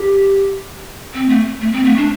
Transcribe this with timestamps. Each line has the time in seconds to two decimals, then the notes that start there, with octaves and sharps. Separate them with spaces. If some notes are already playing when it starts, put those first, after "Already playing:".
Already playing: G4
1.14 C4
1.29 A3
1.61 A3
1.73 C4
1.85 A3
1.98 D4